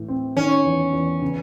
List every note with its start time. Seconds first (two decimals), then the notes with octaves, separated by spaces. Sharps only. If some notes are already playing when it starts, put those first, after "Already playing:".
Already playing: A2 E3
0.08 C4
0.37 D#3 C#4
0.65 E2
0.93 E2
1.22 C#3